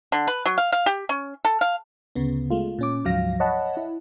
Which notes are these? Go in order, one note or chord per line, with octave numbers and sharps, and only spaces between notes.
D3
B4
F#3
F5
F5
G4
C#4
A4
F5
D2 C#3 B3
G#3 A3 F4
A#2 C#4 D6
D2 G#2 F3 F#3 F5 A#6
C#5 D#5 F#5 A5 B5
E4